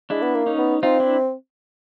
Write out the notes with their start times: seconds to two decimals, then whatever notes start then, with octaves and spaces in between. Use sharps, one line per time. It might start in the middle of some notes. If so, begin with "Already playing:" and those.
0.10 G#3 D4 E4
0.22 B3
0.35 A#3
0.46 C#4 D#4
0.59 B3
0.83 C4 D#4 F4
1.00 D4 E4